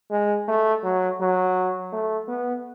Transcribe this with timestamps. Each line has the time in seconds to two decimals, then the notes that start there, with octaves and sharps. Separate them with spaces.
0.11 G#3
0.48 A3
0.84 F#3
1.21 F#3
1.93 A3
2.28 B3